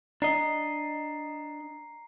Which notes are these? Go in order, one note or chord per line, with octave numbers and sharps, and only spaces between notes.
D4 D#5 A#5 C7